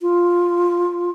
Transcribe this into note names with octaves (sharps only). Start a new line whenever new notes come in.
F4